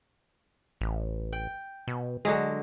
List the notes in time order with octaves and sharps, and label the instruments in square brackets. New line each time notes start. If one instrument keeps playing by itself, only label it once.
[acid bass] A1
[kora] G5
[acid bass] B2
[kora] D3 F#3 G#3 [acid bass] G#4